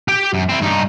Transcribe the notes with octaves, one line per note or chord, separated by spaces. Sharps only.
G4 G5
F#2
C4 E4
G2 D#4